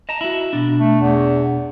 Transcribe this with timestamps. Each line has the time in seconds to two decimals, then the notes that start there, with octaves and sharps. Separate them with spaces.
0.09 D#5 A5 A#5
0.21 E4 F#4
0.53 B2 D4
0.79 A3
1.01 E2